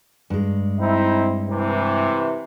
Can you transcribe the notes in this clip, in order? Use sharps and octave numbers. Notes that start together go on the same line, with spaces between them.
G2 G#3
C4 D#4 E4
C3 E3